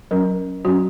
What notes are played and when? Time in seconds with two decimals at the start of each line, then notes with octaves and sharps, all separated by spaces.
0.11 F#3 C#4 A#4
0.65 F#3 C#4 F#4